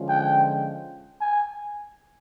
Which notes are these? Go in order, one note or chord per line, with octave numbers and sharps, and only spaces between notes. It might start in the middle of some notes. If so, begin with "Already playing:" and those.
Already playing: D3 F3 G#3 C#4 F4
G5
G#5